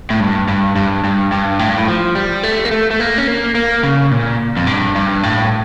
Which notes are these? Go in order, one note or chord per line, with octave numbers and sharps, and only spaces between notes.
A2
G2
G2
G2
G2
G2
A2
G2
A2
F3
G3
A3
A#3
A3
A3
A#3
C#4
A#3
A#3
C#3
A#2
F2
G2
G2
A2